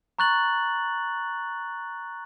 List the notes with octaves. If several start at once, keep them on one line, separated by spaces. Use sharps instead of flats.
A#5 C#6 F#6 A6 F#7